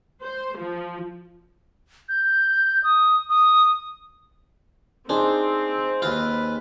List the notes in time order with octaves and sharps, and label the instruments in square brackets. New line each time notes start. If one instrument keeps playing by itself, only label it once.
[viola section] C5
F3
[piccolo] G6
D#6
D#6
[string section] C4 [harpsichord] D4 [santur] D#4 G#4 C5
[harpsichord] D#2 F4 [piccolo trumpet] B4